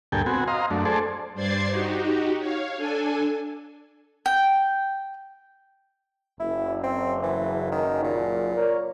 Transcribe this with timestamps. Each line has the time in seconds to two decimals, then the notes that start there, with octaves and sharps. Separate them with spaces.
0.12 D2 G2 A#2 A4 G5 G#5
0.26 B3 C4 F#4 G#5
0.48 D#5 F5 A#5 C6
0.70 F#2 A3 D4
0.85 A3 G#4 A4 C5 D5
1.34 G2 C5 D5 G#6 A6 C7
1.69 D#4 F#4 G4
2.39 C#5 F5
2.77 D4 A4 G#5
4.26 G5
6.40 F#1 E4
6.83 C4
7.23 E3
7.72 D#3
8.04 A#2
8.57 A#4 C#5 D5